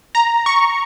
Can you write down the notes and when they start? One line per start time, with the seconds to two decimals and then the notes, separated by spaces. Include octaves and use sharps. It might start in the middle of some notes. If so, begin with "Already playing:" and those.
0.15 A#5
0.46 C#6